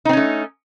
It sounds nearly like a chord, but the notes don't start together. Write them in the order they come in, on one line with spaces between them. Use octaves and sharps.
D#4 C4 C#4 A3